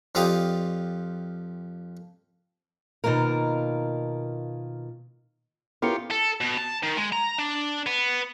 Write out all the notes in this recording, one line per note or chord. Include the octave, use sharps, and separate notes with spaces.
F2 F4 G4 D5 D#5 F5
B2 D#3 A#3 F4 A#4
B3 C#4 E4 F4 G4 A4 A#4 C#7
A4
B2
A5
D#3
G#3
A#5
D4
B3